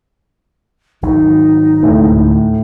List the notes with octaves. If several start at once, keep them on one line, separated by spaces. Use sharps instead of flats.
G#1 F#3 D#4
D2 A2 C3 G#3